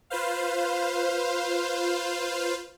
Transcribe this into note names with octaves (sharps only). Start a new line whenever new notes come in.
F4 B4 C5 F5